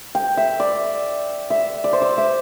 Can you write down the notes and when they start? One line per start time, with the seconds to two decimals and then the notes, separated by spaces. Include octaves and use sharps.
0.15 G5
0.37 E5
0.60 D5
1.50 E5
1.84 D5
1.93 C5
2.02 D5
2.18 E5